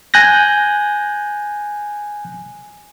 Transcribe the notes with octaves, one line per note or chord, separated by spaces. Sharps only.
G#5 F#6 G6 A#6